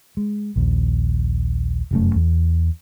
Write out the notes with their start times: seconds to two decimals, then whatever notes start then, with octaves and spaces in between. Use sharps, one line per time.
0.17 G#3
0.56 A#1 D#2
1.91 F1 F#2 A3
2.15 E2